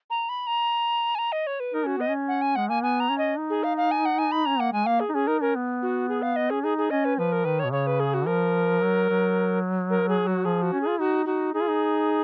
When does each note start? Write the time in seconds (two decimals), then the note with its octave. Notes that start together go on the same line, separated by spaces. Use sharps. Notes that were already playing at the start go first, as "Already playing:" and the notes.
0.10 A#5
0.29 B5
0.47 A#5
1.15 G#5
1.19 A#5
1.32 D#5
1.47 C#5
1.60 B4
1.74 D#4 A#4
1.85 C#4 F#4
1.98 B3 D#5
2.09 C#4
2.28 F#5
2.42 G#5
2.55 G#3 F#5
2.69 A#3 G#5
2.83 B3 G#5
3.00 A#5
3.09 C#4
3.18 D#5
3.38 D#4
3.50 G#4
3.64 F5
3.77 F5
3.91 G#5
4.05 F#5
4.19 G#5
4.32 B5
4.45 C#4 A#5
4.59 A#3 F#5
4.73 G#3 G#5
4.87 A#3 F5
5.00 G#4
5.09 D#4
5.14 C#4 G#4
5.27 D#4 A#4
5.41 C#4 A#4
5.55 B3
5.82 F#4
6.09 G#4
6.22 F5
6.36 D#5
6.50 C#4 G#4
6.63 D#4 G#4
6.78 G#4
6.90 C#4 D#5
7.05 B4
7.18 F3 B4
7.32 A#4
7.45 D#3 B4
7.59 C#5
7.64 B2
7.72 C#3 C#5
7.87 B4
8.00 G#4
8.14 F#4
8.26 F3 A#4
8.82 F#3
9.09 F#3
9.90 A#4
10.09 G#4
10.27 F#4
10.45 F3 G#4
10.62 F#4
10.72 C#4
10.81 G#4
10.87 F4
10.99 D#4 F#4
11.26 D#4 F#4
11.54 D#4 G#4
11.62 F4
11.69 D#4